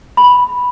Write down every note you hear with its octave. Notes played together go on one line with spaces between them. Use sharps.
B5